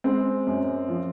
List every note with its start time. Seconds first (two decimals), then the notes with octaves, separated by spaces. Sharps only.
0.04 G#3 C4
0.47 F#2
0.88 F3